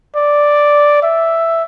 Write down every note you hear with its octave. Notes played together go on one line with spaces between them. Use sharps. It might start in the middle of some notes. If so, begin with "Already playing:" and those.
D5
E5